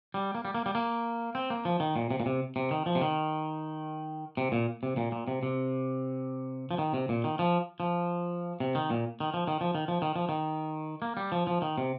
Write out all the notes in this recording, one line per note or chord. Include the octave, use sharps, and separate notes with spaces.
G3
A#3
G3
A#3
G3
A#3
C4
A#3
F3
D#3
A#2
C3
A#2
C3
C3
D#3
F3
C3
D#3
C3
A#2
C3
A#2
A#2
C3
C3
F3
D#3
C3
A#2
D#3
F3
F3
C3
D#3
A#2
D#3
F3
D#3
F3
D#3
F3
D#3
F3
D#3
A#3
G3
F3
F3
D#3
C3